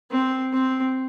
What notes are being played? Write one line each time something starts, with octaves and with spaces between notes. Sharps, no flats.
C4
C4